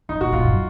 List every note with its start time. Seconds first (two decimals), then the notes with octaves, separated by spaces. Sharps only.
0.09 F3 D#4
0.21 A#2 F#4
0.32 A#2 F4
0.45 F#2